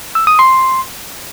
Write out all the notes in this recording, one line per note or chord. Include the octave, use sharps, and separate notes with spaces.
E6
D#6
C6